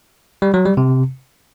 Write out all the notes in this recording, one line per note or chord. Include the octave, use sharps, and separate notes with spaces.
G3
F#3
G3
C3